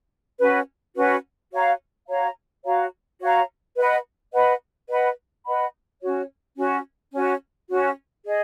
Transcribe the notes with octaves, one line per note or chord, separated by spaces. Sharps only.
C#4 F#4 B4
C#4 F#4 B4
F#4 C#5 F5 A#5
F#4 C#5 F5 A#5
F#4 C#5 F5 A#5
F#4 C#5 F5 A#5
B4 D#5 F#5 B5
B4 D#5 F#5 B5
B4 D#5 F#5 B5
B4 D#5 F#5 B5
C#4 F#4 C#5
C#4 F#4 C#5
C#4 F#4 C#5
C#4 F#4 C#5
G#4 D#5